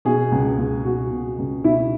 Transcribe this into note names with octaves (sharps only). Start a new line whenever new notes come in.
B2 G#4
C#2
C#2
B2 F#4
B2
C#2
B2 E4